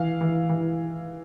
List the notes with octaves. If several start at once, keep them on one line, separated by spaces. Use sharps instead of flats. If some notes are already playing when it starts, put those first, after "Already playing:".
Already playing: E3 F5
E3
E3